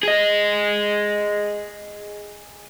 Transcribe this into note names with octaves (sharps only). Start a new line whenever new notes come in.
G#4 D#5